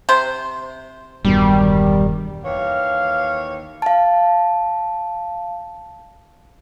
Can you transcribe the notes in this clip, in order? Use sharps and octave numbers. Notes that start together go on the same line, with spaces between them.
C3 C5
E1 G2 B2 D#3 G3
D#2 E3 C#5 F5
F5 A5